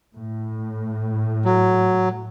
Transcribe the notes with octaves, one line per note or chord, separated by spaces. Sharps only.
A2
F#3